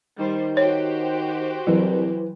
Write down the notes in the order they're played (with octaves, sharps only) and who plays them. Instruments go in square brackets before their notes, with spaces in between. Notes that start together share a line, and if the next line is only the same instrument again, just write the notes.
[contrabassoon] D#3 [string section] G3 C5
[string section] F#4 G4 C5 [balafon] C#5
[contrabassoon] C2 [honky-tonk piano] E3 [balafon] F#3